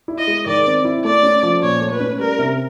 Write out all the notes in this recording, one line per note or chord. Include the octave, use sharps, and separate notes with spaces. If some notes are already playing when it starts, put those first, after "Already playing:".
E4
D#5
G#3
D#3 D5
C4
E4
A3 D5
C#4
F3
A#2 C#5
A3
B4
C#4
G3 A#4
C3